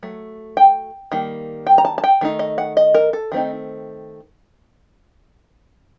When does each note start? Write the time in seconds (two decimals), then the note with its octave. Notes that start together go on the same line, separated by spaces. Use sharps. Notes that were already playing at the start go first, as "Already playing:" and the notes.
0.03 F#3 A3
0.57 G5
1.12 D#3 G3 A#3
1.67 G5
1.78 A#5
1.85 A5
1.98 A5
2.04 G5
2.21 D#3 A3 D#4
2.39 D#5
2.58 F#5
2.77 D#5
2.94 A#4
3.13 A4
3.32 D#3 A3 C4 D#4